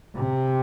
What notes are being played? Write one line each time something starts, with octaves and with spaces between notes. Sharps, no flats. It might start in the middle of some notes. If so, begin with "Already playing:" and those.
C3